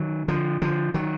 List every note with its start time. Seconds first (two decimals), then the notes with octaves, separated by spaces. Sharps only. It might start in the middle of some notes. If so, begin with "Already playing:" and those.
Already playing: D#3 F#3
0.28 D3 F3
0.62 D3 F3
0.94 D#3 F#3